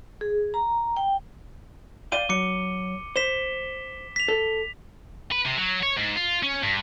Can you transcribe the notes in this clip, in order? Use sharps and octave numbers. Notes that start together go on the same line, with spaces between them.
G#4
A#5
G5
D5 F5 G5 D#7 G7
F#3 D6 C#7
C5 B6 E7 G7
B6 F7
A4
B4
C3
F#3
C#5
G#2
F4
C#4
G2